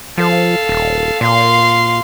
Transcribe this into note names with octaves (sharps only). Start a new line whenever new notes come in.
F3 A4 F5
D#1
A#2 F5 C6